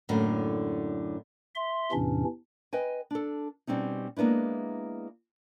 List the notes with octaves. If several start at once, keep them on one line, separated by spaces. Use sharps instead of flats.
F#2 A2 D3 A#3
E5 C6
E2 A2 C3 E3 C#4 D4
B4 D#5 G5 G#5
D4 A4
B2 G3 C4 C#4 D#4
G#3 A#3 B3 D4 E4